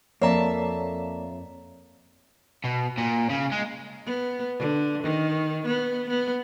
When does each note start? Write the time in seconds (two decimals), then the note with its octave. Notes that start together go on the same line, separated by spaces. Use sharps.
0.22 F2 A#3 C#5 D5 E5 A5 A#5
2.64 B2
2.98 A#2
3.30 C#3
3.52 G#3
4.06 B3
4.58 D3
5.03 D#3
5.66 B3
6.09 B3